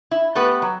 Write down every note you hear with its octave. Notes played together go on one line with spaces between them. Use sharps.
E4
A3 B3 G4 B4
F#3